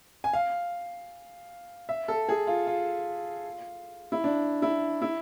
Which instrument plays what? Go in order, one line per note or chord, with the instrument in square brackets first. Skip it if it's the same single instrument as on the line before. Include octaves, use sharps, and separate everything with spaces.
[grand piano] G#5
F5
E5
A4
G#4
F4
F4
E4
D4
E4
E4